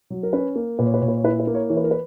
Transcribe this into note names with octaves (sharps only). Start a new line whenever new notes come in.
F#3
A#4
C#4 B4
A#3
A#2 B4
C#5
B4
A#2 C#5
B4
C#5
E4 B4
B4
A#3
A#4 C#5
E3 C#5
B4
A#4
B4